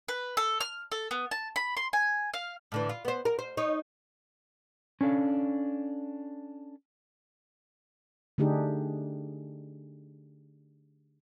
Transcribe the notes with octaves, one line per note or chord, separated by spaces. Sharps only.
B4
A4
F6
A4
B3
A5
B5
C6
G#5
F5
A2 D3 E3
F4
B3 C5
A#4
C5
D#4 C#5
C#4 D4 A4 F5
D3 A3 D4 D#4 G4 G#4